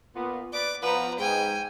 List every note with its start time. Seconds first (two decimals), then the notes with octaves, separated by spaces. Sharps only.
0.15 A#2 B3
0.53 B4 D5 D6
0.82 F3 B3 B4 A#5
1.19 G#2 G5 G#5